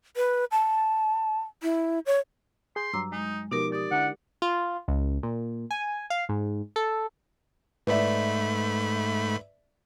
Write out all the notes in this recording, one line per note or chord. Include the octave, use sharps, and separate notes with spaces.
B4
A5
E4
C#5
G#4 C6 G6
G2 F#3 A#5 D6 E6
G#3 D#4
B2 F3 D#4 G4 A#4 D6
G4 D5 D#6
D3 D4 E4 F#5
F4
C#2
A#2
G#5
F5
G#2
A4
G#2 A3 B4 D5 E5 B5